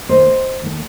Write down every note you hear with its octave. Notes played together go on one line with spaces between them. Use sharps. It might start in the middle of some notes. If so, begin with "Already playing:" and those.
D#2 D#3 A3 C5 D#5
D#2 D#3 A3